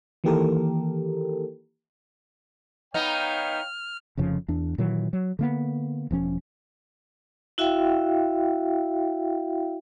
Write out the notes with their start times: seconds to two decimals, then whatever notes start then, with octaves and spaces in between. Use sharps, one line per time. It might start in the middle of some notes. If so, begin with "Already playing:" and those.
0.24 D#3 E3 A#3 G4 A4 A#4
2.94 B3 D#4 C#5 F5 G5 F6
4.17 F1 F2 C#3 F3
4.48 E2 D4
4.78 A#2 D#3 E3 F#3
5.13 F#3
5.39 D3 A#3 B3
6.11 E1 F3 C#4
7.58 E4 F#4 E5 F5 G5